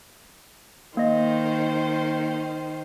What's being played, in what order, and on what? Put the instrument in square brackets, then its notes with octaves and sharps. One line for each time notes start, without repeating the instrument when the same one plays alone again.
[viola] D#3 C5 [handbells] A#3 D#5